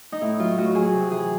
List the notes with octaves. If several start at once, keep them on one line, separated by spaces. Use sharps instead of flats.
D#4
A2 E4
F#3 F4
A2 F#4
F#3 G#4
C3
E3 G#4